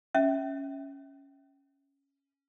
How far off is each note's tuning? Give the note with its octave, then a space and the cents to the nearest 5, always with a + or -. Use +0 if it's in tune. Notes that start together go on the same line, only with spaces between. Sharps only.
C#4 +0 E5 -10